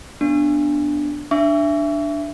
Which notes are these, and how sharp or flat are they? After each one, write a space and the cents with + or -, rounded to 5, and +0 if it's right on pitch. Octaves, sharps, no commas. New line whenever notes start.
B3 +0 D4 +0
D4 +5 E5 +20 C#6 +40